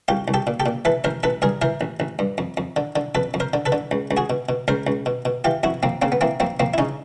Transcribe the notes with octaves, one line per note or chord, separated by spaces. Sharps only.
C2 F4 G4
C2
G4 A4
A#2
G4 A4
A#2
E3 A4 B4
A1 A#4 C5
A1 A4 B4
G2 G#4 A#4
E3 A#4 C5
A1
A1
G2
F2
F2
D3
D3
F2 A4 B4
F2
A#4 C5
D3
A4 B4
D3
C#2
C#2
F#4 G#4
B2
B2
C#2 A#4 C5
C#2
B2
B2
E3 F4 G4
F2 E4 F#4
F2 A#3 C4
C#3 A#3 C4
B3
E3 A#3 C4
F2 A#3 C4
F2 A#3 C4
E4
C#3 C#4 D#4